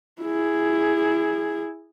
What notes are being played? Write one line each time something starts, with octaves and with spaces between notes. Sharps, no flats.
E4 G#4